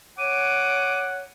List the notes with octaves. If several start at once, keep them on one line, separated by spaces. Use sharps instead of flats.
C#5 F#5 D6 D#7